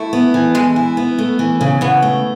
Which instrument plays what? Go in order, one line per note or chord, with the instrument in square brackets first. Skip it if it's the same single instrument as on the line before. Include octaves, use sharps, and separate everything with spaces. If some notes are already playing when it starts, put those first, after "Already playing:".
Already playing: [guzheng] A3 [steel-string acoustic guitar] E4
[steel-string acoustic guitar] B3
E3
[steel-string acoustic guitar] E3 [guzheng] G#3
[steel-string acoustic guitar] E4
B3
A3
E3
C#3
[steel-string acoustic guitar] C#3 [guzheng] B3
[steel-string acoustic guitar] A3